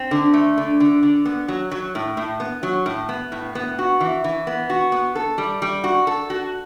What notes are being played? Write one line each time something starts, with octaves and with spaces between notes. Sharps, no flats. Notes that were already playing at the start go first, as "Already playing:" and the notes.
Already playing: C4
D3
A3
D3
D3
D3
B3
F#3
F#3
A2
A2
B3
F#3
A2
B3
A2
B3
F#4
E3
E3
B3
F#4
B3
A4
G3
G3
F#4
A4
F#4